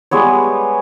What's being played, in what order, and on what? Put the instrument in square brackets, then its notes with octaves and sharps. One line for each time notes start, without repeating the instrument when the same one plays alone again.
[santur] G3 G#3 B3 C#5